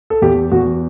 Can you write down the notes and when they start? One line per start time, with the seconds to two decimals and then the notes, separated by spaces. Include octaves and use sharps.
0.10 A4
0.22 E2 G4
0.52 E2 F#4